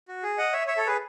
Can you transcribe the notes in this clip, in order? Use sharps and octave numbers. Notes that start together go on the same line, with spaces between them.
F#4
G#4
D#5 F#5
C#5 E5
C#5 E5
A4 C#5
G#4 B4